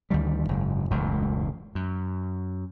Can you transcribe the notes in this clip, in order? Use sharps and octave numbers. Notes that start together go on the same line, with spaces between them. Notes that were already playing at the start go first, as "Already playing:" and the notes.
D2 D#3 G3
F#1 G#2
E1 C#2 F#2 A2
F#2